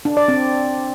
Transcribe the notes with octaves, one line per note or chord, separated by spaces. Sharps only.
D4
D5
C4